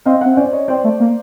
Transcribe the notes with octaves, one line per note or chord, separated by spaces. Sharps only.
C4 D#5 F5
C4 E5 F#5
C#4 C5 D5
C#5 D#5
C4 C5 D5
A3
A#3